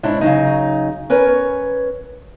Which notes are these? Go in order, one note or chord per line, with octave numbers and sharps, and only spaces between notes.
G#2 C#4 D4 E4
C#3 F#3 D#4
C#4 A#4 B4 C#5